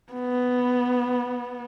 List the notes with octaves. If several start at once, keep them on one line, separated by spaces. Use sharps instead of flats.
B3